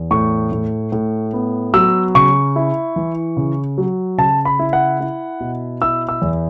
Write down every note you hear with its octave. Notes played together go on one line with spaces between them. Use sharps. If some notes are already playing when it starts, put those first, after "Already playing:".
Already playing: E2
A2 C#6
A2
A2
B3
F#3 E6
C#3 C#6
E4
E3
C#3
F#3
C#3 A5
B5
E4
F#5
E4
B2
E4 E6
E6
E2